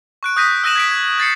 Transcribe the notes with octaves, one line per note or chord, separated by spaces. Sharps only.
C#6 F#6 D7
D#6 F#6 G6 A#6 B6 D#7
E6 F#6 A#6 D#7 E7 F#7
G#6 B6 D7
G#6
G6 A6 C7 C#7